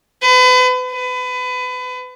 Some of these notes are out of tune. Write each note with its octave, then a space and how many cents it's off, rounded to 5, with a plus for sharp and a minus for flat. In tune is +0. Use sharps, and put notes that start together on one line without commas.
B4 +35
B4 +30